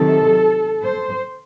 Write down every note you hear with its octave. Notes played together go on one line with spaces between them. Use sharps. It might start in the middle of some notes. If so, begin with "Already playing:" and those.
Already playing: C3 D#3 F#3 A4
C5